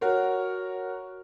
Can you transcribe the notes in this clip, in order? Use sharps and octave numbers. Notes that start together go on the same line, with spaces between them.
F#4 A#4 C#5